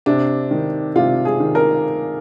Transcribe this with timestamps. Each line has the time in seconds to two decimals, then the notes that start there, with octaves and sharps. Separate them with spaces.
0.06 C3 D4
0.51 D#3
0.96 C3 F4
1.25 G#4
1.40 D#3
1.55 A#4